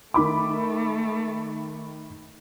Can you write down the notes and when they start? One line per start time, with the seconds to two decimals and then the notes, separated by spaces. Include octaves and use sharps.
0.14 D#3 A3 B5 D6